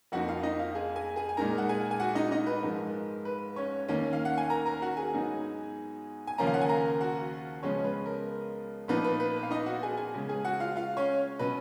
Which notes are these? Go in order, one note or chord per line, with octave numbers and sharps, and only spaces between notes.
F2 F3 A#3 D#4 F#4 F#5
F4 F5
D#4 D#5
F4 F5
G#4 G#5
G#4 G#5
G#4 G#5
G#5
A#2 G#3 D#4 A#4 A#5
F#5
G#4 G#5
G#5
F#4 F#5
D#4 D#5
D#4 D#5
B4
G#2 F3 G#3 A#4
B4
C#4 C#5
D#2 D#3 A#3 C#4
F5
F#5
G#5
A#4 A#5
A#4 A#5
F#4 F#5
G#4 G#5
G#2 F#3 B3 D#4
G#5
D#2 C#3 F3 A#3 C#4 A#4 A#5
F5
F#5
G#5
A#4 A#5
F#4 F#5
C#2 C#3 F3 G#3 B3 C#4 C#5
B4
A#4
A#2 F3 B3 D#4 B4
B4
B4
B4
F5
D#4 D#5
F#4 F#5
G#4 G#5
G#4 G#5
C#3 G#3 C#4
G#4 G#5
F#4 F#5
F4 F5
F4 F5
C#4 C#5
B2 F#3 C#4 B4